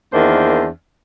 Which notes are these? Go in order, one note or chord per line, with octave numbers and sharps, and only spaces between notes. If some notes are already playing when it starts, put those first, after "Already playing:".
E2 D#3 A#3 D4 C5